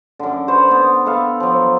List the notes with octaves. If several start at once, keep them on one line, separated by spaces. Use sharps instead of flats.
F#2 D3
F#4 B4 C5 F#5
B3
A4 B4 E5 F5
F3 F#3